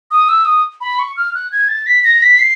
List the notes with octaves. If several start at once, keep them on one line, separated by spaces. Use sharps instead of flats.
D#6
E6
D#6
B5
C#6
F6
F#6
G#6
A6
B6
A#6
B6
C7